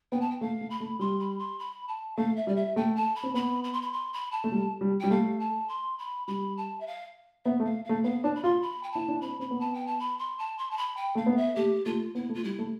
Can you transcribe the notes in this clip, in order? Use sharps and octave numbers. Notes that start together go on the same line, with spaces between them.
B3 G5
A5
G5
A3 F5
A3
B5
A3
G3 C6
B5
C6
B5
A5
A3 F5
E5
G3 D5
E5
A3 G5
A5
B5
C4
B3 B5
B5
C6
B5
C6
B5
A5
A3
G3
G3
G3 G5
A3 F5
A5
C6
B5
G3 B5
A5
E5
F5
B3 E5
A3
F5
A3 F5
B3 F5
D4 A5
B5
F4 C6
B5
G5
E4 A5
D4
C4 B5
C4 B5
B3
A5
G5
A5
B5
C6
A5
C6
A5
B5
G5
A3 F5
B3
E5
A3 G4
A3 F4
B3 E4
A3
F4
G3 E4
A3